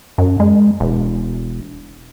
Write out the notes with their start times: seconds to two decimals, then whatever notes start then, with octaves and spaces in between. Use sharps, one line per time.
0.18 F#2
0.40 G#3
0.80 E1